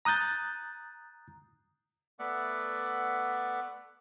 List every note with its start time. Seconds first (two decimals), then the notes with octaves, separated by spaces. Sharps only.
0.05 A#5 D#6 F#6 G6 A6
2.19 A3 B3 D5 E5 F#5